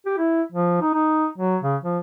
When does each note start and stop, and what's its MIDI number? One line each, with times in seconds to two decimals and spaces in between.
0.06 0.14 67
0.18 0.42 64
0.52 0.77 53
0.81 0.94 63
0.94 1.27 63
1.38 1.57 54
1.62 1.76 49
1.83 1.98 53